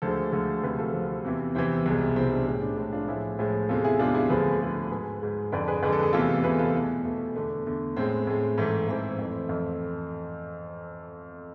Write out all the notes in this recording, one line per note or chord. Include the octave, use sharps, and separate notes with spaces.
D2 D3 F3 G#3 A4 C5
D2 D3 F3 G#3
D2 C3 F3 G#4 B4
F4 A4
D2 C3 F3
E2 C3 E3
E2 C3 E3 C4 E4
C2 B2 G#3
C2 B2 G#3 C4 E4
D4
A2 G#3 C4
D4
A2 G#3 D4
D4 F4
A2 F3 G#3 E4 G#4
A2 F3 G#3
E2 C3 G#3 F4 A4
E4 G#4
E2 C3 G#3 D4 F4
E4 G#4
D2 D3 F3 G#3 G#4 B4
D2 D3 F3 G#3
G#2 G#3 G#4 B4
G#2 G#3
F2 D3 G#3 B4 D5
G#4 B4
F2 D3 G#3 B4
A4
G#4
E2 C3 E3 A3 F4 A4
E2 C3 E3 A3 G#4 B4
F4 A4
E2 B2 A3 E4 G#4
E2 B2 A3
E2 D3 A3 D4
E2 D3 A3
A2 G#3 C4
A2 G#3
G#2 E3 A3
G#2 E3 A3 C4 E4
F2 E3 A3
F2 E3 A3